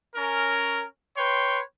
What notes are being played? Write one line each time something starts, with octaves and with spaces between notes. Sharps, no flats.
C#4 A#4
B4 C#5 G5 C6